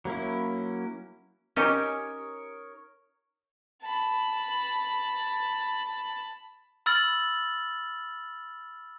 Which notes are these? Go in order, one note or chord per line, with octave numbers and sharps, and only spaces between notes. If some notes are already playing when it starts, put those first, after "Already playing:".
F#3 A#3 C#4 E4
C#4 D#4 G4 A#4 C#5 D#6
A5 B5
B5 E6 F6 A6 F#7